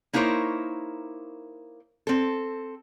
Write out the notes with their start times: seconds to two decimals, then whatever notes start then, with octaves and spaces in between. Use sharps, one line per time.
0.13 A#3 D#4 E4 A#4 C5 C#5
2.07 C4 A4